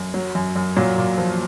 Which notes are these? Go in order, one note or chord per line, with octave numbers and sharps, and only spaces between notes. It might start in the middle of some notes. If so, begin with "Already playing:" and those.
Already playing: F#2
F#3
F#2
F#2
A#2 F#3
A#2
F3